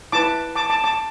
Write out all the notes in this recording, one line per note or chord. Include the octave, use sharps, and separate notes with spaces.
E4 B4 A5 D6
A5 D6
A5 D6
A5 D6